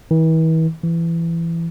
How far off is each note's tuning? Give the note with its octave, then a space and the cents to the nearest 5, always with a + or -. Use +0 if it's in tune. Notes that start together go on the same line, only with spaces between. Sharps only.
E3 -40
E3 +20